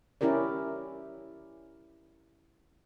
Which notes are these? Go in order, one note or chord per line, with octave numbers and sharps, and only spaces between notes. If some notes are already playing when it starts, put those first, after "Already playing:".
C#4 E4 G4 A#4 D5